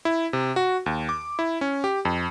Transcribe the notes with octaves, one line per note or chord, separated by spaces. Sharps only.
E4
C3
F#4
D#2
D6
E4
C#4
G4
F2